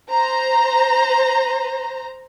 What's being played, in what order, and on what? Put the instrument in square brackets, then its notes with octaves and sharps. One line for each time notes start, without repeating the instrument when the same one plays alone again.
[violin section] C5 A#5